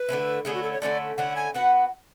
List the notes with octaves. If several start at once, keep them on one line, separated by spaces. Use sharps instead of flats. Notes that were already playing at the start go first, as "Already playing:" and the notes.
Already playing: B4
D3 A3 C#4 E4
D3 A3 C#4 E4 G#4
F#4
A4
C#5
D3 A3 C#4 E4 D5
D3 A3 C#4 E4 F#5
G#5
B3 F#4 B4 F#5